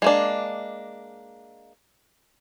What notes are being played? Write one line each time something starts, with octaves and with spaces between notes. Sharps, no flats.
G#3 A#3 D4